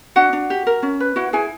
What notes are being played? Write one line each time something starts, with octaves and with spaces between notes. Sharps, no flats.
D4 F#4 F#5
D4
G4
A#4
C#4
B4
E4 F#4 F#5
E4 G#4 G#5